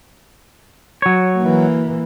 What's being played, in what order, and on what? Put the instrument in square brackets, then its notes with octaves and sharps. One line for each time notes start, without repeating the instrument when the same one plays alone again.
[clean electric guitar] F#3 C#5
[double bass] E3 A#3